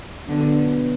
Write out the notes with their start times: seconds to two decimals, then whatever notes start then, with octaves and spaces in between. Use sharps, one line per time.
0.28 B2 D3 F#3 B3